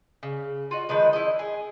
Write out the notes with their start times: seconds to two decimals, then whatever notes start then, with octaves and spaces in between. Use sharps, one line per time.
0.23 C#3
0.71 F4 F#4 D#5
0.89 D#3 F3 G#3 B4
1.13 E4 D#5
1.39 G#4